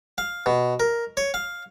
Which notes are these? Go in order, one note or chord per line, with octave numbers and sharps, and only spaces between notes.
F5
B2
A#4
C#5
F5